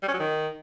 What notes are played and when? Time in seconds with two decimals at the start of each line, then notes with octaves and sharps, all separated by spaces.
0.03 G3
0.08 C#4
0.14 F#3
0.20 D#3